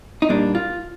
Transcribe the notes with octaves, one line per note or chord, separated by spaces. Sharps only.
D#4
A#2 G3 A#3 D4
F4